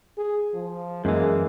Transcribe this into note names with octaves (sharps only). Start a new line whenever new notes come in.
G#4
F3
F#2 E3 G#3 A#3